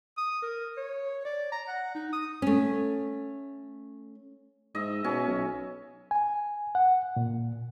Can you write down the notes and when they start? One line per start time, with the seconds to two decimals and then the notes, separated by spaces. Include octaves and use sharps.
0.17 D#6
0.42 A#4
0.77 C#5
1.25 D5
1.52 A#5
1.68 F#5
1.94 D#4
2.13 D#6
2.42 A3 C#4
4.75 G#2 D#5 E5
5.04 B2 C#4
5.27 B1
6.11 G#5
6.75 F#5
7.16 A#2